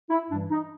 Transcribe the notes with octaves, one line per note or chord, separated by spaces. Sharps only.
E4
G2 E3 G3 D4
D#4